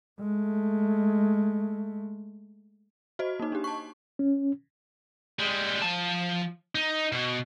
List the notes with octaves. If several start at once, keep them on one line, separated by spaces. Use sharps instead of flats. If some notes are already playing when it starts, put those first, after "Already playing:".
G#3 A3
F#4 C5 D#5
A#3 D#4
D4 G4
A5 C#6
C#4
G3 G#3
F3 A5
D#4
B2